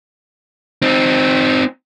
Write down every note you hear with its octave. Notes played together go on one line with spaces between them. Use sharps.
C4 D#4